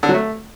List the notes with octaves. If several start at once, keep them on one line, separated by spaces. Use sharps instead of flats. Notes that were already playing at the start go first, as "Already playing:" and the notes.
D3
F#3
A3